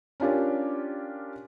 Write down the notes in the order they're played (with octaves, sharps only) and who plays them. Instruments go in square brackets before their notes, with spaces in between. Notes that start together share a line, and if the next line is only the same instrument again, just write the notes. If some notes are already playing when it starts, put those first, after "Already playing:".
[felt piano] C#4 D4 F4 G4 A#4